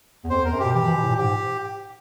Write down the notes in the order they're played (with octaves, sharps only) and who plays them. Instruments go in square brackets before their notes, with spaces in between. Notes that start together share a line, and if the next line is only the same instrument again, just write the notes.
[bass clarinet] E2
[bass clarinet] F2 [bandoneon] C5
[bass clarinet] E2 [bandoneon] A#4
[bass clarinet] F#2
[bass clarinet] B2 [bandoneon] G4
[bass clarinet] E3 [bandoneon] G4
[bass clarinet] E3
B2
A2
A#2
[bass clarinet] G#2 [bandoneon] G4